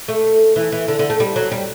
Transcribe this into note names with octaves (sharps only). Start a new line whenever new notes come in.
A3
E3
E3
D3
D3
A3
G3
F#3
G3